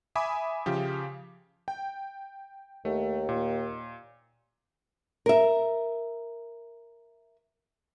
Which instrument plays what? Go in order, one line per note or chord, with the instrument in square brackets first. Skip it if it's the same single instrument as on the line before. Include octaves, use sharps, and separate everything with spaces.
[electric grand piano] E5 G#5 B5 D6 D#6
C#3 F3 G4
G5
[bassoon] D#2 [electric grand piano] A3
[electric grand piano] A#2
[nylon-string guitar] A#4 E5